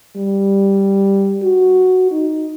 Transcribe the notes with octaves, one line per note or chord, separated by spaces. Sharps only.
G3
F#4
D#4